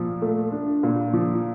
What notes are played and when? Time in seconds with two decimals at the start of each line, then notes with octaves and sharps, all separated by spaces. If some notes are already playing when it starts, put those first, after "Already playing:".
Already playing: A#2 F3
0.22 A3
0.52 D4
0.83 A#2
1.13 F3